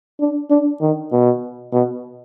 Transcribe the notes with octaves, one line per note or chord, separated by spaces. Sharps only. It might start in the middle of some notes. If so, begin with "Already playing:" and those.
D4
D4
D#3
B2
B2